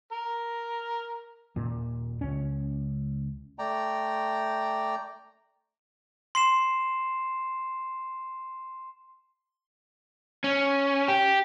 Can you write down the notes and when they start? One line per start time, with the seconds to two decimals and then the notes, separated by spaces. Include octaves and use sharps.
0.12 A#4
1.56 D#1 A#2
2.21 C#2 C#4
3.59 A3 D5 G5 A#5
6.35 C6 C7 E7
10.44 C#4
11.08 G4